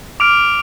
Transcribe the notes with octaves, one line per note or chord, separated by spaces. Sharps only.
D6 F6 D7 F7